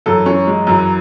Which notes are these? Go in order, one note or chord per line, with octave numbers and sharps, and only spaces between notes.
F#2 E3 A4
C#4
G#3
F#2 E3 F#3